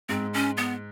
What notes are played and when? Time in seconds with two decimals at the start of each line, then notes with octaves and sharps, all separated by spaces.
0.09 G#2 C4
0.34 C#4
0.57 B3